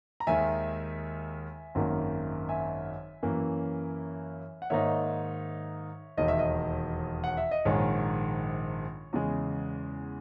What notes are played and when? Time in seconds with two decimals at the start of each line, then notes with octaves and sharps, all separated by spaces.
0.20 A#5
0.27 D#2 D#3 G#3 E5 G#5
1.75 G#1 F#2 D#3 A#3
2.49 E5 G#5
3.23 F#2 E3 A#3 C#4
4.62 F#5
4.70 G#2 D#3 A#3 D#4 C#5 E5
6.17 E1 D#2 D#3 D#5
6.28 E5
6.39 D#5
7.24 F#5
7.37 E5
7.51 D#5
7.65 A#1 G#2 D#3 G#3 C#5
9.13 E2 C#3 G#3